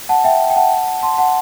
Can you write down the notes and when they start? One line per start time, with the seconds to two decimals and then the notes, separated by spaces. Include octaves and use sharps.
0.09 F#5 A5
0.24 E5 G5
0.50 G5
0.56 F#5 A5
1.03 A5 C6
1.18 F#5 A5